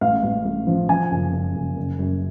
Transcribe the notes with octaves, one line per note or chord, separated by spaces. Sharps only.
A1 F5
A1
A1
F3
F3 G#5
F#1
F#1
F#1
F#1
F#2